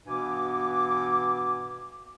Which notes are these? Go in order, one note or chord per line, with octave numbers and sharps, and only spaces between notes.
G2 B2 E3 B3 G#5 D6